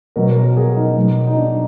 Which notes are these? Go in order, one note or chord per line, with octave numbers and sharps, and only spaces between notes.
B2 F#3 A#4
A#4
A#4
G#4
D#4
B2 F#3
D#4
D4